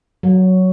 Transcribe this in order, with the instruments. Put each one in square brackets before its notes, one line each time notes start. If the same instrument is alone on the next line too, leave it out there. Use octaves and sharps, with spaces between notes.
[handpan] F#3